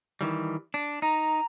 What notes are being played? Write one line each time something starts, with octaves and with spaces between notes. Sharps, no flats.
D#3 E3 G3
D4
D#4 A#5